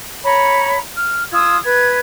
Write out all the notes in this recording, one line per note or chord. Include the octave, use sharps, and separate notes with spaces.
C#5 A#5 B5
F6
F4 D#6 E6 G#6
B4 G#6